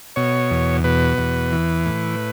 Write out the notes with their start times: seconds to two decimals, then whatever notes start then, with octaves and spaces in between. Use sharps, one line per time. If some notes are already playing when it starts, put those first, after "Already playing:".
0.16 B2 C#5
0.51 E2
0.84 B2 B4
1.18 E2
1.52 E3
1.86 A2